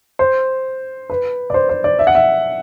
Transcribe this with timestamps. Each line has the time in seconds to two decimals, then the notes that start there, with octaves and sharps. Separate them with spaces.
0.19 C5
1.10 B4
1.50 D5
1.54 C5
1.69 C5
1.84 D5
1.99 E5
2.07 F#5
2.15 E5